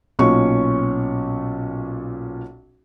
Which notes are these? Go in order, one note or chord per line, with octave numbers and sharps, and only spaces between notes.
B1 A#2 C#4 C#6